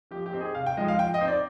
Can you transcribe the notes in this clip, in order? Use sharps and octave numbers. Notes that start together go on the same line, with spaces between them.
F3 G4
G4
C4 D#4
G#4
C3 F5
G5
F3 G#3 D#4 D#5
F5
F3 G5
D#5
C4 D#4
D5